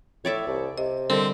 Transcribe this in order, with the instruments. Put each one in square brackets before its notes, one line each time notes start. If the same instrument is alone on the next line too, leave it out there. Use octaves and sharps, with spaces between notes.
[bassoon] A2 [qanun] C#5 D5 E5
[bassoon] C2
[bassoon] C3 [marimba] D#5
[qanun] D3 [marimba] G3 A4 A#4 [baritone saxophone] C4